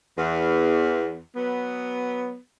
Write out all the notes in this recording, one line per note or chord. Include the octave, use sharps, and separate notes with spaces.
E2
F#3 B3